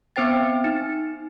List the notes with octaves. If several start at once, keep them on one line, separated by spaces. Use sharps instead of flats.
B3 C4 C5 G5 A6
D#4